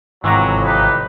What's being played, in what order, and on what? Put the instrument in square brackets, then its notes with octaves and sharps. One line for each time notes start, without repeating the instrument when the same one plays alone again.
[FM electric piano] G#1 A#5 [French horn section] F2 A2 [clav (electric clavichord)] C3 E3 [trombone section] F#3
[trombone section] D#4 G4 B4